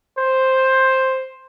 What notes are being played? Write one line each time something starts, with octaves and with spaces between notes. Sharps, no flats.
C5